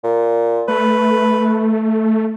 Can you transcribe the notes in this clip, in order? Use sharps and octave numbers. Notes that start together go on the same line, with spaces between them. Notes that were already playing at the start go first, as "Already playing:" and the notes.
A#2
A3 B4